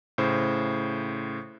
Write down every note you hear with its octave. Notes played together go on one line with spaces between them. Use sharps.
A2 C#3 C5